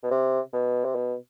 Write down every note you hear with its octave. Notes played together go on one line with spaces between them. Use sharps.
B2
C3
B2
C3
B2